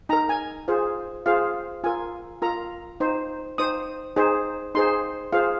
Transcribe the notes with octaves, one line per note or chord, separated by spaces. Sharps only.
D#4 A#4 A#5
G#5
F4 G#4 C5
F4 G#4 C5 F5
F4 A#4 G#5
F4 A#4 A#5
D#4 C5
D#4 C5 D#6
D#4 G#4 C5
D#4 G#4 C5 C6
F4 G#4 C5 F5